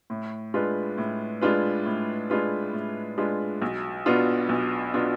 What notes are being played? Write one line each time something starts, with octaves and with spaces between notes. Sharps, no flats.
A2
G#3 D4 F4 B4
A2
G#3 D4 F4 B4
A2
G#3 D4 F4 B4
A2
G#3 D4 F4 B4
B1
B2 B3 D4 F4
B1
B2 B3 D4 F4